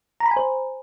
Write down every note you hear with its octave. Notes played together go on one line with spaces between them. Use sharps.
A#5
B5
G#5
C5